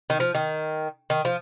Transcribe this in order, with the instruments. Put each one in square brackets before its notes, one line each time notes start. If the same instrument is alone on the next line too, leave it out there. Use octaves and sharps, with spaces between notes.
[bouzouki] D#3
F3
D#3
D#3
F3